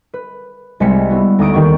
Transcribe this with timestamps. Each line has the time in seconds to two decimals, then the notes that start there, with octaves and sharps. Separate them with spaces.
0.14 B4
0.80 C2 C3 G#3 B6 C#7
1.09 B3 E4 F#4
1.39 D2 D#4 D5 D#6 D7
1.54 D#2 D#3 G4 C#6